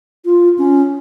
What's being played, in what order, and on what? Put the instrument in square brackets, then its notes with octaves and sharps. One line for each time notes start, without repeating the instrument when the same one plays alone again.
[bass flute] F4
C#4